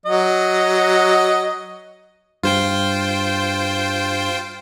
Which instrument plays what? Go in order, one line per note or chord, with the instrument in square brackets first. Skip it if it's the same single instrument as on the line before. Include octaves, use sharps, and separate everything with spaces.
[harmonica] F#3 D#5
[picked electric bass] G2 [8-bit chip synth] F4 C5 G5